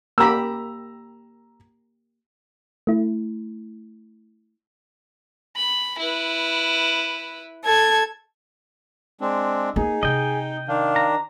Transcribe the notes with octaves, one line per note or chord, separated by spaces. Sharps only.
A#3 G4 A#5 B5 E6
A3 E4
B5
E4 B4
A4 G#6
G#3 C4 D4
A#3 D#4 G#4
C3 D#5 G5
D#3 D4 F5
A#5